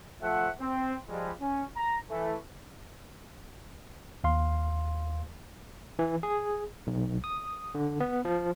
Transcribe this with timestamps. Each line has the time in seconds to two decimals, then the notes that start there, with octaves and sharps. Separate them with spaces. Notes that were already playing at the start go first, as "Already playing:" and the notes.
0.22 F3 A3 E5 F#5
0.59 C4
1.09 F3 G3 G#3
1.40 C#4
1.76 A#5
2.09 E3 A3
4.24 D#2 F5 C6
5.99 E3
6.23 G#4
6.87 B1
7.24 D#6
7.75 D3
8.00 B3
8.25 F3